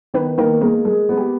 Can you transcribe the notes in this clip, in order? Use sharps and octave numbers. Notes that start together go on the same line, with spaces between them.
D#3 B3 B4
D#3 A#3 A#4
G#3 A#3 A#4
G#3 G#4
B3
G4